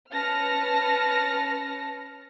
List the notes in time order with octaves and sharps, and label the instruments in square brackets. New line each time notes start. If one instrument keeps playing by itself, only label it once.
[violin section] C#4 B4 A5 F6 A#6 C#7